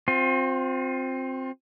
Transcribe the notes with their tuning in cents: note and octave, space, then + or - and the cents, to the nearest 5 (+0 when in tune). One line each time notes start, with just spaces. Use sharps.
C4 +5 F4 +35